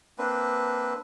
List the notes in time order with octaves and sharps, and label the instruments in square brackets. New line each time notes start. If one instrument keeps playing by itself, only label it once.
[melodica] A#3 C4 D4 B4